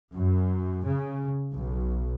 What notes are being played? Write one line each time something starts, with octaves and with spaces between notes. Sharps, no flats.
F#2
C#3
B1